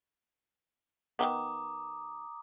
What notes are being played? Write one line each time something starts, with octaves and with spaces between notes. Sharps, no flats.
D#3 F3 B3 A#5 D6 D#6